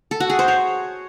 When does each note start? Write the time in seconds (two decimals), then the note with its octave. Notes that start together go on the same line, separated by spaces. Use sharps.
0.11 A4
0.20 F#4
0.30 G#4
0.39 C5
0.48 C#5